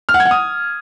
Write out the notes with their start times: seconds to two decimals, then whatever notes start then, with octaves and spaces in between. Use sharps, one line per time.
0.09 F6
0.14 F#5
0.20 G#6
0.25 F#5
0.31 D#6